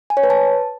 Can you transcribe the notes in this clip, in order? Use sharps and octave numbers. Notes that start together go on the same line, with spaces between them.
G#5
C#5
B4
A5